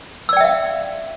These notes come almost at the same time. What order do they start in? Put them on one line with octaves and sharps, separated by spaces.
E6 D5 G5 E5 F5